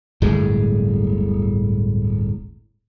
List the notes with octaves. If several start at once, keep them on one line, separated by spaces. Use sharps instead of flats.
D1 G1 A2 G#3